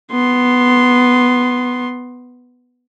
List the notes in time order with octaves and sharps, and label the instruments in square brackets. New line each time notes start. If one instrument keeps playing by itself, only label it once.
[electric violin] B3 C6